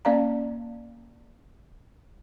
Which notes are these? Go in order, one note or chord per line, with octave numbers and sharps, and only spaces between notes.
A#3 C#4 D5 F5 A#5